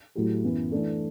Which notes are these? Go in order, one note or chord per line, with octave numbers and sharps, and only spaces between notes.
A2 F#3 A3 E4 G4
F#2 E3 B3
E3 A3 D4 A4